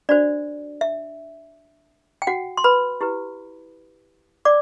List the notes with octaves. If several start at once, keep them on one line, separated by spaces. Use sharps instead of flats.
D4 F#4 C5 D5
E5
G5
F#4 F#5
C6
B4 B5
E4 G4 B4
D5 D6